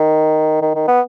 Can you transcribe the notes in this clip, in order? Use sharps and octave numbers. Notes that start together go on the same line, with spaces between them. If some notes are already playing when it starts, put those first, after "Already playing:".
Already playing: D#3
D#3
D#3
B3